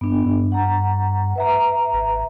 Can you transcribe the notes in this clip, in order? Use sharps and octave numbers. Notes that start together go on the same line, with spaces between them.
G2 B3 D4
G2
F#5 A#5
B4 E5 A#5
G#1